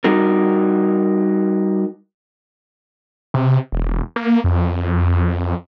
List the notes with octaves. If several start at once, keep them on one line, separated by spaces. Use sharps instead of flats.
G3 D#4 F#4 A#4
C3
E1
A#3
F2